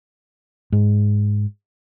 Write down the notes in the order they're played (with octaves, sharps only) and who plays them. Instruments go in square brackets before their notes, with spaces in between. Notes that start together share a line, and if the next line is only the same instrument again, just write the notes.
[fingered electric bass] G#2